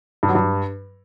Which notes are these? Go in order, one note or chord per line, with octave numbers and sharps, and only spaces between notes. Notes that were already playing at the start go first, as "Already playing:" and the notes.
G2
F#3
G2